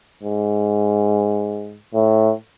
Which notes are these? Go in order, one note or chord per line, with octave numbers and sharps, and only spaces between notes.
G#2
A2